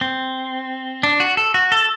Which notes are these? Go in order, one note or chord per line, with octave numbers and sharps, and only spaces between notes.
C4
D4
F#4
A4
F#4
A4